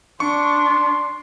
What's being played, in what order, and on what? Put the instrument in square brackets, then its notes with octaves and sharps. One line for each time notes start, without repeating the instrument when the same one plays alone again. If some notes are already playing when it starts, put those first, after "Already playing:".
[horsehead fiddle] D4 [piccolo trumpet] C6 [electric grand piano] C#6